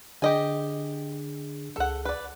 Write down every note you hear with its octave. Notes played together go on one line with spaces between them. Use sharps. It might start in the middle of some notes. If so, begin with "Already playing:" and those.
D3 D4 G4 G#4 D#5 G#5
C#2 G#4 A4 F#5
B4 D5